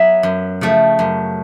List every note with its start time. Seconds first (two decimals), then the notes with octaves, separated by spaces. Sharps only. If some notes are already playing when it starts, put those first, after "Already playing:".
Already playing: F#3 B3 E5
0.23 F#2
0.61 C#3 F3 A3
0.99 F#2